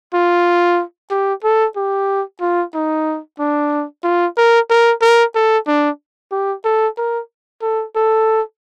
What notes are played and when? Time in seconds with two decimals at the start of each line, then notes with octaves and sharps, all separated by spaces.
0.14 F4
1.10 G4
1.44 A4
1.76 G4
2.41 F4
2.74 D#4
3.39 D4
4.03 F4
4.37 A#4
4.70 A#4
5.01 A#4
5.35 A4
5.67 D4
6.31 G4
6.65 A4
6.97 A#4
7.62 A4
7.95 A4